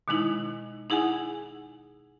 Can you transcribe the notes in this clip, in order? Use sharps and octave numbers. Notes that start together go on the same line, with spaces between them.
B2 D#3 G#3 D#4 E4
D#4 E4 G#4 F#5 G#5